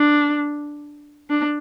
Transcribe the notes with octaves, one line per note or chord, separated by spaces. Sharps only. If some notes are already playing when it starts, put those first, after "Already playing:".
Already playing: D4
D4